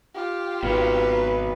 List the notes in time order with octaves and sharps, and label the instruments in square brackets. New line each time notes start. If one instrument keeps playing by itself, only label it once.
[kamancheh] F4 G4
[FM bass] G#1 [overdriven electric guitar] B2 F#3 [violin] B4